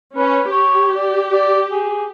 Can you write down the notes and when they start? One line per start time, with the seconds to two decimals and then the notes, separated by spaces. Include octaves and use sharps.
0.16 C#4 B4
0.52 G4 C#5
0.96 D5
1.33 D5
1.71 G#4